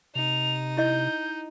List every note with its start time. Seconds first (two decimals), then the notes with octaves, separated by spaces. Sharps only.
0.15 C3 D#4 F7
0.77 E4 D#5 G6